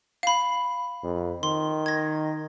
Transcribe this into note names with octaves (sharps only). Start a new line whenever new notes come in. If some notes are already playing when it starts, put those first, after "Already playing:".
F5 B5
F2
D#3 C6
G#6 A#6